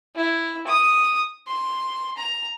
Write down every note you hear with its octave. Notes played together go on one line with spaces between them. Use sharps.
E4
D#6
C6
A#5